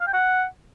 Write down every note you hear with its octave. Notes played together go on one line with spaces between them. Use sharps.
F5
G5
F#5